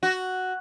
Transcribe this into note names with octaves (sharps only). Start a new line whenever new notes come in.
F#4